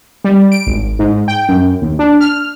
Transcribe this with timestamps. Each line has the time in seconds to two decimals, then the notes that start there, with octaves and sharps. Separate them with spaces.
0.25 G3
0.52 D7
0.67 G#1
0.99 G#2
1.28 G5
1.49 F#2
1.82 D#2
1.99 D4
2.20 F6